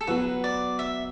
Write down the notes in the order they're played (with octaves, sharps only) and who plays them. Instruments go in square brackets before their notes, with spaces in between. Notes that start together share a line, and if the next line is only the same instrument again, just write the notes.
[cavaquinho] A4
[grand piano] F#3 B3 F#4 [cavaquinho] B4
[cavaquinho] D5
E5